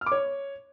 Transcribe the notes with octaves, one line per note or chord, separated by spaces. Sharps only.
F6
D6
C#5